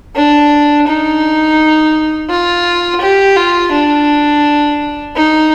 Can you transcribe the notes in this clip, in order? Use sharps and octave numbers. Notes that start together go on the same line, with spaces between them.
D4
D#4
F4
G4
F4
D4
D#4